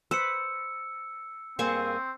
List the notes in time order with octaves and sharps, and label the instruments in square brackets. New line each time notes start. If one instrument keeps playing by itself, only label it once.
[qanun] B4 C5 [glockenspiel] E6 C#7
[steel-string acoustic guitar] G2 A#3 G#4 [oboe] C4 [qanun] C5 G#5 C#6